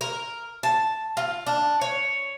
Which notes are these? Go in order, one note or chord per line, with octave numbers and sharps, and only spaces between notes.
A#4
A5
F4
D4
C#5